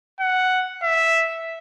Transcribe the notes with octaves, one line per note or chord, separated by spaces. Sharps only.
F#5
E5